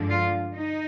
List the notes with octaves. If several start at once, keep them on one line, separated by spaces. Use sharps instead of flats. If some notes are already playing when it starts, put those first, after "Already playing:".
Already playing: G2 D3 F3 G#3 D4
F4
D#4